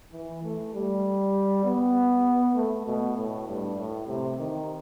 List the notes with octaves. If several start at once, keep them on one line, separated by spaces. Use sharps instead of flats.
E3
A3
G3
B3
A3
B2
A2
G2
A2
C3
D#3